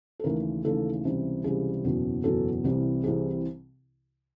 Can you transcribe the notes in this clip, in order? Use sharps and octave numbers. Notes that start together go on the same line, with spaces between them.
A4
D#2 C#3 E3 A3 A#4
D#2 C#3 E3 A3 A4
C#2 C3 E3 G3
C#2 C3 E3 G3 G#4
F#1 E2 B2 F#3
F#1 E2 B2 F#3 A4
C2 C3 E3 G3
C2 C3 E3 G3 G#4